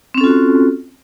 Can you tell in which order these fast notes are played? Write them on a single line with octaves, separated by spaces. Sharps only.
C4 C#4 A4 F4 F#4